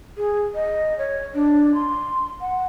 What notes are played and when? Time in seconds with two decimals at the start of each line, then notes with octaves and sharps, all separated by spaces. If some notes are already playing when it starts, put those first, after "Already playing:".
0.17 G#4
0.55 D#5
0.98 C#5
1.34 D4
1.74 C6
2.41 F#5